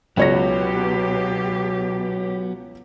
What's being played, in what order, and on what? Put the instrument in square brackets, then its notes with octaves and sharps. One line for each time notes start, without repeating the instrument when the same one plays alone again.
[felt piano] C#2 C#5 A#6 [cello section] B2 G4 [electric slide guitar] F#3 B3